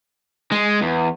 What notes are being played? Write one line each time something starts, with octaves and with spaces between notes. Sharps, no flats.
G#3
E2